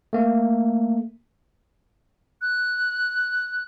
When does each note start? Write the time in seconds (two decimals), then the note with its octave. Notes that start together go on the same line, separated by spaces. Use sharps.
0.13 A3 A#3
2.42 F#6